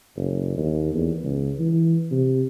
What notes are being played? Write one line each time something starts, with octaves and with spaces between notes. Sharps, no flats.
F#1
D#2
E2
C#2
E3
C3